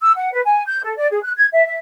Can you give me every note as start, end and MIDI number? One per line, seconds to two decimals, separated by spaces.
0.01 0.12 88
0.16 0.30 78
0.32 0.40 71
0.44 0.62 80
0.66 0.80 91
0.84 0.94 69
0.96 1.07 74
1.11 1.19 68
1.23 1.31 90
1.36 1.46 92
1.52 1.64 76
1.66 1.77 76